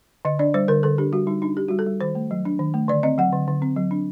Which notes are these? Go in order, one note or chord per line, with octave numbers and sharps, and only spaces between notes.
D3 D#5
D4 D5
G3 C5
D3 A#4
D3 A4
D4 G4
G3 F#4
G3 D#4
D4 D#4
D4 G4
G3 F#4
A4
G3
D#3 C5
A3
F#3
D4
D#3
A3
D3 D5
C4 D#5
F#3 F#5
D3
D3
C4
F#3
D4